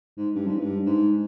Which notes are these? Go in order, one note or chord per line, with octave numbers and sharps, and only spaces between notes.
G#2
G2
G#2
G2
G#2